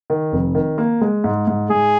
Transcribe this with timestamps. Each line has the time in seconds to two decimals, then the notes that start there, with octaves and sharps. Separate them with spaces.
0.10 D#3
0.32 F1
0.55 D#3
0.78 A#3
1.01 G#3
1.24 G#2
1.47 G#2
1.70 G#2 G#4